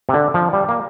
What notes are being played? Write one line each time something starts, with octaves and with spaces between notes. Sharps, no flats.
C3
D3
F3
G3
A#3